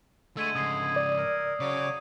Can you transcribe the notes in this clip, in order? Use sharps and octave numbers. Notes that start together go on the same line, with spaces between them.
D3 G#3 A3 E6 G#6 D#7
G#2 C#3 D#6 G#6 C7
D5
A#4
C#3 F#3 C#5 D6